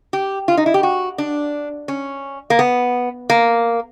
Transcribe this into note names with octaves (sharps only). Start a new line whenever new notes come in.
G4
F4
D#4
E4
G4
F#4
D4
C#4
A#3
B3
A#3